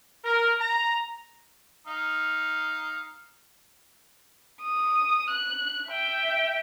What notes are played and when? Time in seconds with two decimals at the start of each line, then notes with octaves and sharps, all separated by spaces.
0.25 A#4
0.60 A#5
1.87 D#4 F5
4.61 D#6
5.30 F#6
5.89 E5 G5